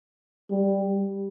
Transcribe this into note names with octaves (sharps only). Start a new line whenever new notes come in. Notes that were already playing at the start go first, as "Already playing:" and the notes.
G3